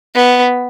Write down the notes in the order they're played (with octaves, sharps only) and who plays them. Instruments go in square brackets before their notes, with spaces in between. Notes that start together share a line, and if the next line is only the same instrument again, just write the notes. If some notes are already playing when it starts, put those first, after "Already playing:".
[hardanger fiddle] B3